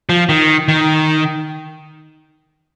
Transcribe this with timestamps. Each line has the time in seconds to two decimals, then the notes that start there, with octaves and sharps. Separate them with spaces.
0.09 F3
0.29 D#3
0.68 D#3